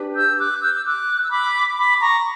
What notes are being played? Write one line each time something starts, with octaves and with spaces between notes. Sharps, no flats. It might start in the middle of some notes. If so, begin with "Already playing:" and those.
Already playing: D4 G4 B4
E6 G6
D6 F#6
E6 G6
E6
D6 F#6
E6
B5 D6
B5 D6
A#5 C#6